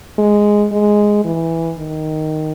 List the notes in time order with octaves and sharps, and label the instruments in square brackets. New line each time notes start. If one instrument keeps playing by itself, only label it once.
[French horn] G#3
G#3
E3
D#3